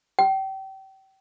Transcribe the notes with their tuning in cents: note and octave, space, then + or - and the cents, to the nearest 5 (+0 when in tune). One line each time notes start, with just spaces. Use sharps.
G5 -30